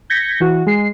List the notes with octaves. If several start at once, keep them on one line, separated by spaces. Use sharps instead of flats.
G6 G#6 A#6 B6 C#7
E3 F#4
G#3 C7